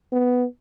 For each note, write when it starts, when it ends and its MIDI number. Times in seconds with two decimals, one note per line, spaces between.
0.12 0.45 59